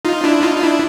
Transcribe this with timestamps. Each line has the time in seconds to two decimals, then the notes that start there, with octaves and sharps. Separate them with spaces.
0.05 D#4 F4
0.24 D4 E4
0.43 D#4 F4
0.57 F4
0.63 D4 E4